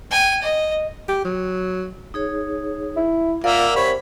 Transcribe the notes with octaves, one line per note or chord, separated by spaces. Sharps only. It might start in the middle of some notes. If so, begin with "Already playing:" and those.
G5 G#5
D#5
G4
F#3
D#4 G#4 C#5
E4
A#3 F4 A#4 D5 E5 F#5
C3 C#5 B5